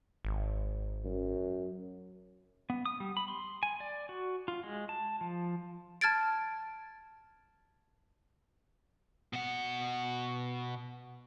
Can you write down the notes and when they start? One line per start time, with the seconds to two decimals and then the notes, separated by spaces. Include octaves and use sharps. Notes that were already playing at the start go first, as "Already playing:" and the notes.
0.25 G#1
1.05 F#2
2.70 B3
2.85 D#6
3.00 G3
3.17 B5
3.28 C6
3.63 G#5
3.80 D5
4.09 F#4
4.48 F4
4.63 G#3
4.89 A5
5.21 F3
6.01 A5 F6 G#6 A6 D7
9.33 B2 F#5